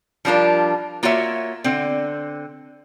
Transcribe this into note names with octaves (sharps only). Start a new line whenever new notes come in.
F3 G3 D4 F4 A#4
A#3 F4 F#4 A#4 C#5 E5
D3 C4